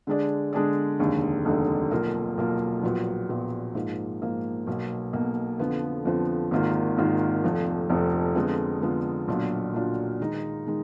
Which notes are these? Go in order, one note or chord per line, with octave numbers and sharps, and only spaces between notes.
D3 G#3 D4 G#4 D5
D3 G#3 D4 G#4 D5
F1 D#2 D3 G#3
F1 D#2 D3 G#3
B1 B2 A#3 F4 A#4
B1 B2 A#3 F4 A#4
A#1 A#2 F#3 B3
A#1 A#2 F#3 B3
G#2 F3 A#3
G#2 F3 A#3
B1 B2 A#3
B1 B2 A#3
F2 D3 F3 B3
F2 D3 F3 B3
G#1 G#2 D#3 A#3 F4
G#1 G#2 D#3 A#3 F4
F1 F2 F3
F1 F2 F3
F2 D3 G#3 B3 F4
F2 D3 G#3 B3 F4
B1 A#2 F#3 D4 F4
B1 A#2 F#3 D4 F4
D#3 G#3 D#4
D#3 G#3